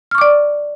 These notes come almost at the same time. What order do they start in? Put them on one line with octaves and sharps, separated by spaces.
F6 C#6 D6 D5